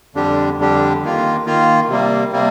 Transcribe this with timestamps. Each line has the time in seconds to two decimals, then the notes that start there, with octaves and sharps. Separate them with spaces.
0.15 F2 D3 G3 D4 G4
0.58 F2 D3 G3 D4 G4
1.02 D#3 A#3 F4
1.46 D#3 A#3 F4
1.89 C3 G3 A#3
2.32 C3 G3 A#3